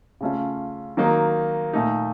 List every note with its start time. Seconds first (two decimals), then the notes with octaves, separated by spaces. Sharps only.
0.21 C#3 A3 C#4 F4
0.97 D#3 F#3 A#3 D#4
1.73 A#2 A3 D#4